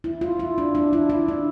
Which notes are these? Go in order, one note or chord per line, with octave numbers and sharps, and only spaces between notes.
E4
F4
E4
D4
D4
E4
E4
D4